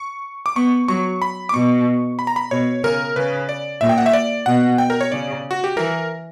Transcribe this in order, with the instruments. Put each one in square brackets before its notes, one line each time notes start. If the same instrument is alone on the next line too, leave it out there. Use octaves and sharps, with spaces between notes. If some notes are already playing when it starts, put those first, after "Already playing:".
Already playing: [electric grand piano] C#6
D6
[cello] B3 [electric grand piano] C#6
[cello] F#3 [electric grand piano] C#6
[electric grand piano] B5
D6
[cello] B2 [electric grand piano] C#6
[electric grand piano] B5
A#5
B5
[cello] B2 [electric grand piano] C#5
[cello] C#3 [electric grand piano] A#4
[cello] C#3 [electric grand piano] B4
[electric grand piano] D5
[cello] A#2 [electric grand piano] E5
[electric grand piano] G5
F#5
E5
D5
[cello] B2 [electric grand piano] F#5
[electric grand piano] G5
A#4
C#5
[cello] C#3 [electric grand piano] D5
[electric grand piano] F#4
G4
[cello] E3 [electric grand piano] A#4